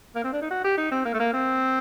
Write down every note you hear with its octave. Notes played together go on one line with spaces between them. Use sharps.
A#3
C4
D4
D#4
F#4
G4
D#4
C4
A#3
A3
A#3
C4